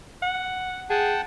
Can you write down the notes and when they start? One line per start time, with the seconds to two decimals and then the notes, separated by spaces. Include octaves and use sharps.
0.22 F#5
0.90 G#4 F#5 G5 A5